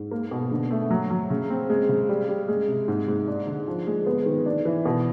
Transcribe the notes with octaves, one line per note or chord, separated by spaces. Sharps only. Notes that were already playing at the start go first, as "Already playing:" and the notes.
Already playing: G#2
A#3
B2
D3
A3
F#3
F#3
C#3
C4
G#3
C#3
G3
G3
G#3
C3
G#2
G#2
D4
D3
F3
G#3
B3
D#3
D4
E3
B2